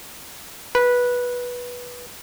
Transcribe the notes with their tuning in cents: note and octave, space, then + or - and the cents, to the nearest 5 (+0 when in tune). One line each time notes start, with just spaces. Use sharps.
B4 -15